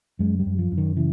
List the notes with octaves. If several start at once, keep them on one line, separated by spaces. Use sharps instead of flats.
F#2 G#3
G3
F#2
F3
F#2
D#3
C#3 E3